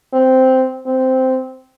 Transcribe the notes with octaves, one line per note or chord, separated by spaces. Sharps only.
C4
C4